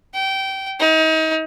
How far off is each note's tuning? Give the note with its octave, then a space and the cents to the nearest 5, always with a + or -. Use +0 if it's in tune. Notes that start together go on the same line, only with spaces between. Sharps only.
G5 -20
D#4 +35